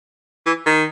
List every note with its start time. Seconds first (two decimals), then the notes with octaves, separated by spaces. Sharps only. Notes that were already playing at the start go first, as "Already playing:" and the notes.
0.46 E3
0.66 D#3